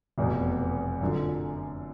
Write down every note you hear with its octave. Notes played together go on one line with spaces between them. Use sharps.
F1 E2 B2
F#2 D3 F3